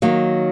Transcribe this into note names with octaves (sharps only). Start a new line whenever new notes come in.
D#3 F#3 A#3